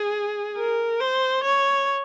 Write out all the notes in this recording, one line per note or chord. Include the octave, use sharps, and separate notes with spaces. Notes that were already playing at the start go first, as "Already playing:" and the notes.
Already playing: G#4
A#4
C5
C#5